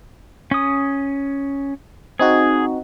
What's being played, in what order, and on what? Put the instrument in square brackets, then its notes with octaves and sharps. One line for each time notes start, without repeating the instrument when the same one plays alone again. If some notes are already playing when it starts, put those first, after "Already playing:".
[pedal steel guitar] C#4 D#6
[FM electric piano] C4 D#4 F#4 [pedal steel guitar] G#4